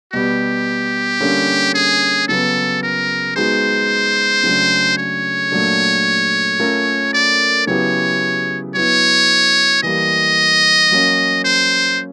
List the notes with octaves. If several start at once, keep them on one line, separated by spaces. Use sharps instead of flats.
B2 G3 B3 G4
D3 G3 A#3 C#4
G#4
C#3 F#3 B3 A4
A#4
G#3 B3 D#4 F#4 C5
C#3 F#3 A3 D4
C#5
A#2 F#3 A3 D4
A3 C#4 F4 A#4
D5
C#3 F#3 B3 E4 G4 C#5
F#3 B3 E4 C#5
E3 G3 A#3 D#5
F#3 A#3 C#4
C5